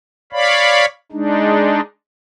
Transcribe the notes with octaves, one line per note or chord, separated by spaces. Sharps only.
C#5 D5 F5 B5
G#3 D4 D#4